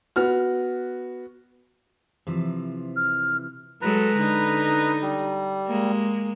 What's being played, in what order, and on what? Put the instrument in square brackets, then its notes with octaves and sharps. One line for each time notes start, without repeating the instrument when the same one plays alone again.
[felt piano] B3 F#4 F6
[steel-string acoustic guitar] C3 E3 F3
[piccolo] F6
[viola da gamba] F#3 G#3 A4 [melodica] B4 A#5
[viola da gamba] D3 D#4
[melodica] G3
[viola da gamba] G#3 A#3